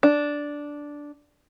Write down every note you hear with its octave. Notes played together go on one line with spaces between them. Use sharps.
D4